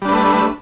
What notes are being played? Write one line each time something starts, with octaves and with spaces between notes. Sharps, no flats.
G3 A3 D4 B4